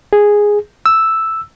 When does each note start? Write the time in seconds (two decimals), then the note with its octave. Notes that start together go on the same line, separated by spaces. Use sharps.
0.13 G#4
0.86 E6